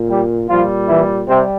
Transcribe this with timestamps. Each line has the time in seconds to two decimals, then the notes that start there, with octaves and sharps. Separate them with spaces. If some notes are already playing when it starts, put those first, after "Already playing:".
Already playing: A#2
0.09 G3 G4
0.48 A#2 F3 G3 F4
0.88 E3 E4
1.28 C3 G3 C4